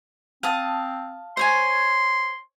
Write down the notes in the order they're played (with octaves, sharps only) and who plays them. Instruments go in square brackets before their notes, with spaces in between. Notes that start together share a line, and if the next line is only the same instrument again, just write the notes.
[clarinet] C4 [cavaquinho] F5 A5 D#6
[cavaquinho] C5 C#5 G#5 [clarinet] C6